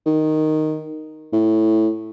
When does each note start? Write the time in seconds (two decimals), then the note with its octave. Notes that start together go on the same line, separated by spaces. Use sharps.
0.06 D#3
1.33 A2